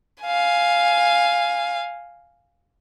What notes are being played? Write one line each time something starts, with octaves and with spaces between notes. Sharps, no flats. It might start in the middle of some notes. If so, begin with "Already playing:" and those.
F5 G#5